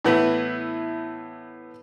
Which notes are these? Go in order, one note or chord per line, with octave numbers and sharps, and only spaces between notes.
A2 E3 B3 E4 B4